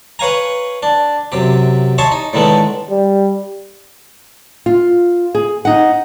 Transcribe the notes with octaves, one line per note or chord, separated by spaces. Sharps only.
B4 C#5 F5 G#5 A#5
D4
F#2 C3 G4
C#5 D#5 E5 G#5 A5 C6
D#4
A2 D3 D#3 G#3 A3 B3
G3
F4
G#4
D#4 F#5